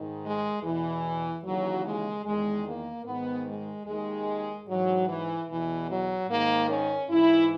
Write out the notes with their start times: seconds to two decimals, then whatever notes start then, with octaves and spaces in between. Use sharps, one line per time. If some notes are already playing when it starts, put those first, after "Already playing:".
Already playing: G#2 D#3
0.23 G#3
0.63 E2 B2 E3
1.44 D#2 C#3 E3 F#3
1.85 G#3
2.25 E2 D#3 G#3
2.65 A#3
3.06 G#2 D#3 B3
3.47 G#3
3.86 D#2 D#3 G#3
4.68 G#2 E3 F#3
5.08 E3
5.48 E2 B2 E3
5.88 F#3
6.29 G#2 D#3 A#3
6.69 C#4
7.10 G#2 E3 E4